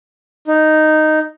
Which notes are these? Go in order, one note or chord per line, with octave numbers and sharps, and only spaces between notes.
D#4